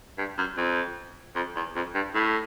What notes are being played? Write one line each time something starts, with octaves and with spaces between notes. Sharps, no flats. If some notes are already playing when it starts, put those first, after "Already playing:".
G2
F#2
F2
F2
E2
F2
G2
A2